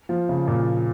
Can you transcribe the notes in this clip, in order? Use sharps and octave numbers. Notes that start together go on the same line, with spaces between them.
F3
C#3
A#2